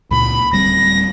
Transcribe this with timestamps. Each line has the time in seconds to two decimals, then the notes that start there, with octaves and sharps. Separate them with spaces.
0.11 C#2 A#2 B5
0.53 D1 G3 C4 A#6